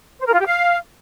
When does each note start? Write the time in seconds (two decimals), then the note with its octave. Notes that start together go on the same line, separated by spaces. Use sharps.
0.20 C5
0.26 A#4
0.33 F4
0.39 G4
0.46 F5